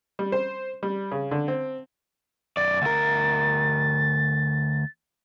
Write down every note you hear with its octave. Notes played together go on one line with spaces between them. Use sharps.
G3
C5
G3
C#3
D3
C4
F#2 D5 A6
D2 A#4